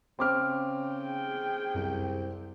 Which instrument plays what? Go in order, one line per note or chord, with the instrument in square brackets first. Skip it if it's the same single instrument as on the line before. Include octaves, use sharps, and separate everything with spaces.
[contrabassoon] C#3 [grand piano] C4 D6 F6
[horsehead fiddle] G#4 G5
[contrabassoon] C2 [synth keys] F#2